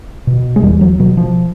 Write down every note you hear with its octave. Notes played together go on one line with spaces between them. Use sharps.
B2
G#3
E2 G3
F#3
B2 F#3
F3